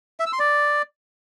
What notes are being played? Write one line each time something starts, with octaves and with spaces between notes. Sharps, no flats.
E5
E6
C6
D5